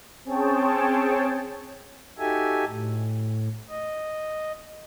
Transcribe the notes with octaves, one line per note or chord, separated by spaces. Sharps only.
C4 C#4 G#4 C#5 G5 A5
D#4 F#4 G4 A4 E5 G#5
A2
D#5